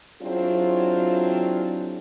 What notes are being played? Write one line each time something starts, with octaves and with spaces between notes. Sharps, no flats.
F#3 C4 D4 E4 F4 G#4